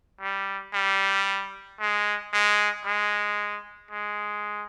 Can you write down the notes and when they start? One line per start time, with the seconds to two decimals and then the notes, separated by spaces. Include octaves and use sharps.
0.21 G3
0.73 G3
1.80 G#3
2.33 G#3
2.85 G#3
3.91 G#3